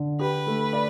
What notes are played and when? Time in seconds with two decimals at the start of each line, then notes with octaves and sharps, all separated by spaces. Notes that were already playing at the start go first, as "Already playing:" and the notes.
Already playing: D3
0.19 G4 B4
0.47 A3
0.73 D5